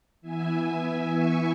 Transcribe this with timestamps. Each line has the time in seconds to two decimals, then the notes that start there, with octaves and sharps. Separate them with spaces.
0.22 E3 B3 E4 E5 G#5
0.51 E5 G#5
1.13 G#5 C#6